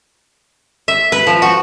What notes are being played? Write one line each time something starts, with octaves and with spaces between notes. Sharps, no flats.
E5
B4
F3
F#4